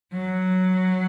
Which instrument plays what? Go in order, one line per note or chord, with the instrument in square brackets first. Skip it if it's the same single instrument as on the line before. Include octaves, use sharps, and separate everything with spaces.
[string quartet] F#3